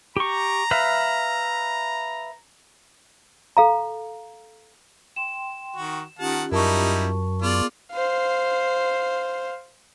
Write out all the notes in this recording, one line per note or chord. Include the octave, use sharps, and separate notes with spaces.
G4 A#5 C#6
B4 E5 F5
A4 F5 A#5
G5 C6 E7
D#3 F#4
D#3 C#4 F4 G4 F#5 A5
F#2 G3 D#4 E4 A#4 A5 C#6
B3 F4 G#4 D5
C5 F5